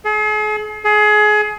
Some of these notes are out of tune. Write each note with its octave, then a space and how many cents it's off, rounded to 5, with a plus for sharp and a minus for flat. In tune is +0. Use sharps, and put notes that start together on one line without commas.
G#4 +40
G#4 +25